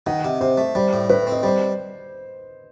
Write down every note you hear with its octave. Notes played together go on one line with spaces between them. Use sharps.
D#3 D#5 F#5
C3
C3 C5
A3
G3 C5
A2
A2 B4
C4
D#5
G3 C5